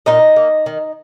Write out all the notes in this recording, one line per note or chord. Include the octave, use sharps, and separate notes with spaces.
A#2 D#4 D#5
A#3
D#3